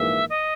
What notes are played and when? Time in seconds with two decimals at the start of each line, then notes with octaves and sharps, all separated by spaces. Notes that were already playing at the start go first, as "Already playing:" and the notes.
Already playing: A#1 G#2 E3 A#3 E5
0.30 D#5